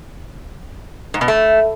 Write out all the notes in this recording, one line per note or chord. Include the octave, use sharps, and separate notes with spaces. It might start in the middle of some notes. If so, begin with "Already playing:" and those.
G#2
B2
A3